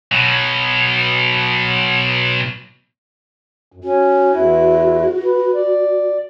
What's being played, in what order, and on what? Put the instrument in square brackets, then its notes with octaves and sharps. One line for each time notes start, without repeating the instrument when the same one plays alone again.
[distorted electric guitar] B2 F#3
[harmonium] F#2
[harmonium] C#4 [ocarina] F#4
[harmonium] E2 E4
B4
D5